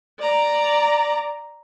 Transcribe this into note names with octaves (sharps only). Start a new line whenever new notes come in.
D5 A#5